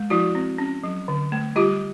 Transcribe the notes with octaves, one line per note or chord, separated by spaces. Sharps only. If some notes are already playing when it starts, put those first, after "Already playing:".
Already playing: G#3
F3 E4 F#4
C4
C#4
F#3
D3
A3
G3 F4 G4